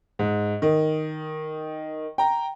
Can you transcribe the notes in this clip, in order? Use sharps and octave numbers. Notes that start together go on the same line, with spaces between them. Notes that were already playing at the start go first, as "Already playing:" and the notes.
G#2
D#3
G5 A#5